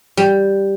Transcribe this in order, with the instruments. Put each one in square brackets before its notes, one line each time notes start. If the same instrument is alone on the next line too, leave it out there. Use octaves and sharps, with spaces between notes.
[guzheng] G3